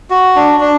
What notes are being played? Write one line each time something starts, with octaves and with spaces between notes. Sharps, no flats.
F#4
D4
D4